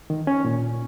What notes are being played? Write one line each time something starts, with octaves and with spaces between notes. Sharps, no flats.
D#3
C#4
A#2